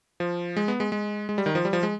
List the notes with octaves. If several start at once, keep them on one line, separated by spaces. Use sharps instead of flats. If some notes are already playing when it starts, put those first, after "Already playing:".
F3
G#3
B3
G#3
G#3
G#3
G3
D#3
F3
G3
F3
G#3